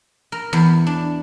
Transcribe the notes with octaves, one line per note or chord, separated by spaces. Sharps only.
A#4
E2
D4